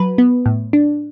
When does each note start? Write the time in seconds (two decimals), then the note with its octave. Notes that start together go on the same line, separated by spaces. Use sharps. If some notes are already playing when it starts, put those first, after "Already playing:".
Already playing: F#3 B4
0.18 B3
0.46 A2
0.73 D4